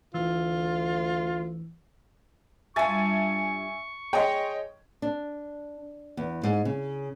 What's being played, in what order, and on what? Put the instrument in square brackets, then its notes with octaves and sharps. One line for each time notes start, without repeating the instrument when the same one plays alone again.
[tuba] D2 [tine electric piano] E3 E6 [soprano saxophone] F4
[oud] G2 F4 [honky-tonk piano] E5 G#5 A6 [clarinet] C#6
[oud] G#4 [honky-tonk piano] C#5 D#5 C6 [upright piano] G5
[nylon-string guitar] D4
E2
G#2
C#3